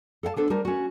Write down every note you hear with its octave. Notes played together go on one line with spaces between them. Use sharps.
A4 F5 F#5 A5
B3 D4 A4 C5
G3 A#4 C5 A5
C#4 F#4